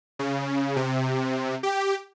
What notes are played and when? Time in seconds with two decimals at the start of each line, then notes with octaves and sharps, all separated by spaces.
0.19 C#3
0.76 C3
1.63 G4